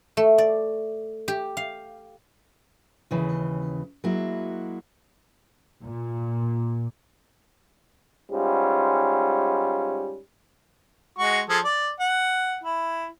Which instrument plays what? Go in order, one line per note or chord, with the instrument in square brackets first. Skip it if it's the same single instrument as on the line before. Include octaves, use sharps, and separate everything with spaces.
[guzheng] A3
D5
G4
F5
[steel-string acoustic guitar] D#2 C#3 E3
F#3 G#3 A#3 E4 F#4
[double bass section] A#2
[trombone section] G#2 G3 C#4 F4
[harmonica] G#3 F#4 C#6
F3 G#4 A4
D5
F#5
E4